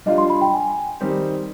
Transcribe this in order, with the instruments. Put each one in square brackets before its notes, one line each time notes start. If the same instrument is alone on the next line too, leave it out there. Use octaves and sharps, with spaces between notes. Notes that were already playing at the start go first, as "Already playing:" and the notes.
[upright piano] G3 D4 F4 [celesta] D#5
[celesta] C6
B5
G5
G#5
[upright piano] D#3 G3 C4 D#4 G4